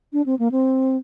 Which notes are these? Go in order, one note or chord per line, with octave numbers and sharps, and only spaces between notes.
D4
C4
A#3
C4